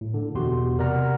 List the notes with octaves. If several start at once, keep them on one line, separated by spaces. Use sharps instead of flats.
A2
D3
E2 B2 F#4 G4 C6
C3 A#4 D5 F#5 A#5 F6